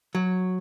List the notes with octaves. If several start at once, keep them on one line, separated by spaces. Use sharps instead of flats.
F#3